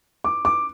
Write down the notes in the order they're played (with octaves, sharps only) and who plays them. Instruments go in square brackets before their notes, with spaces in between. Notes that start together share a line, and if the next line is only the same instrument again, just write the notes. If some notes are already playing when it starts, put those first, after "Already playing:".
[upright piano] D6
D6